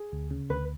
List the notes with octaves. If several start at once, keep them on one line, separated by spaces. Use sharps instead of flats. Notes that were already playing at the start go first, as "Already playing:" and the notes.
Already playing: G#4
D2
C#3
D2 B4